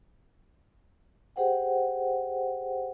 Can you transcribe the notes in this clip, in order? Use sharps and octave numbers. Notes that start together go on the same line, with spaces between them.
G4 G#4 C5 F#5 G5